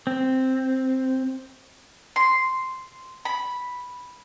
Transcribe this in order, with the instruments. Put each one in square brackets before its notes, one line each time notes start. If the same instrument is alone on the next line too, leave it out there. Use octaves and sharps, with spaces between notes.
[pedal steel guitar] C4
[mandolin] C6
B5